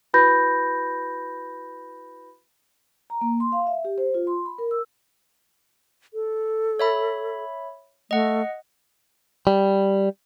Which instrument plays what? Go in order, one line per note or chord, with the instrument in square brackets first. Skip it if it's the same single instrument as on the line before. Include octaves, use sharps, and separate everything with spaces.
[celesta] E4 F#4 B4 B5 G6 A#6
[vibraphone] A#5
A#3
C6
F5
E5
G4
C5
F4
C6
B5
A#4
E6
[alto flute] A4
[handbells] C#5 E5 B5
[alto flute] A3 [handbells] D#5 F#5
[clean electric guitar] G3